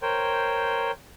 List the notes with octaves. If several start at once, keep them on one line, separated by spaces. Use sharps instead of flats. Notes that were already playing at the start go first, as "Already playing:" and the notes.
A#4 C5 C#5 G5 C6